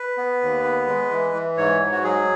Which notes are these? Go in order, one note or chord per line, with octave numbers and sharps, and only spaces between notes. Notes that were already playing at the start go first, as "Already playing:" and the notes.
Already playing: B4
B3
D#2
B3
G#3
E3
E3
G#2 C#5
G#2
F#4
F#3 G#4